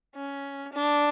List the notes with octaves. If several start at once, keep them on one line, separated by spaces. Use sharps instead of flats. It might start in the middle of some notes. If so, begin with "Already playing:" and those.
C#4
D4